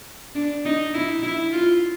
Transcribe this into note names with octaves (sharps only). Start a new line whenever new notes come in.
D4
D#4
E4
E4
F4